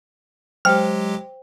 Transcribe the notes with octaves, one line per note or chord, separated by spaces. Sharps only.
F#3 G#3 G4 C5 G5 F6